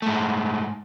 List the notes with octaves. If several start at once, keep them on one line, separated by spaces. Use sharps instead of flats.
G#2 A3